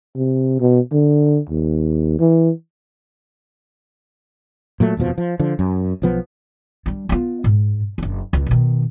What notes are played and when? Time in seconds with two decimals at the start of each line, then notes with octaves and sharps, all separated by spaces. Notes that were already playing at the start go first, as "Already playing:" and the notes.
0.16 C3
0.60 B2
0.92 D3
1.49 D#2
2.20 E3
4.80 A#2 F#3 A3
4.97 D#1 F2 B2 F3
5.18 F3
5.39 D3 F3
5.59 F#2
6.02 B1 F3 B3
6.86 G3 D4
7.09 B3 F4
7.44 G#2
7.98 F#1 D4
8.33 C#2
8.46 B2 D#3